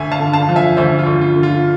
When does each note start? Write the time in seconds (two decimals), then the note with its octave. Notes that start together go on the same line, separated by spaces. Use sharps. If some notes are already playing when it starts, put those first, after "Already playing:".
Already playing: D2 E5 G#5
0.12 F5 A5
0.20 D3
0.33 F5 A5
0.49 F3
0.56 E5 G#5
0.77 D2 C5 E5
0.99 F4
1.07 D2
1.21 F4
1.36 D3
1.43 F4